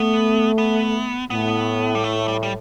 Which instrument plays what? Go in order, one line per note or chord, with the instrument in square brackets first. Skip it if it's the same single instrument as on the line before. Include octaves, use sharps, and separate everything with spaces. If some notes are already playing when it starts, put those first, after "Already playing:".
Already playing: [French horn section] A3 [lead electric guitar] B3
[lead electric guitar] B3
[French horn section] A2 [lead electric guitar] B3
[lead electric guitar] G3
A3
G3
G3